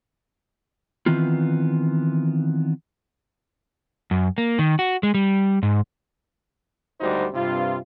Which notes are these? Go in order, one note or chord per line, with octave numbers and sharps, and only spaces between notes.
D#3 E3 B3 C4 F4
F#2
A#3
D#3
F#4
G#3
G3
G#2
G#1 D2 G3 D#4 F#4 C5
G2 C3 F4